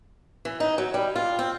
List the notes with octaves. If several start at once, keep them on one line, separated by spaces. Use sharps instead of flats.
E3
D#4
F#3
G3
F4
C4